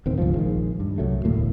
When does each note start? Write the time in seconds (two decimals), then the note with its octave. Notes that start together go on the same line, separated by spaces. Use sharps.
0.06 D1 B1 D#3 C4
0.18 C#2 G2 F3
0.34 A#1 D#3 G#3
0.80 G2
0.98 C2 F#3 A3
1.24 E1 D2 A2 A#3